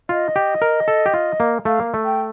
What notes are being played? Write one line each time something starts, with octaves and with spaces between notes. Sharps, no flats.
F4 D#5
G4
A#4
A4
G4
F4
A#3
A3 F5
A#3
A3
G5